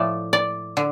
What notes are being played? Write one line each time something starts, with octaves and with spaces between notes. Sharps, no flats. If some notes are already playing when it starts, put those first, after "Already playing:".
Already playing: A2 F3 A3 D5
D5
D3